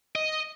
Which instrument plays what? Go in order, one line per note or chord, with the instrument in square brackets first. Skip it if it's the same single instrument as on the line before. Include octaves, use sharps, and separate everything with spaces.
[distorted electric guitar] D#5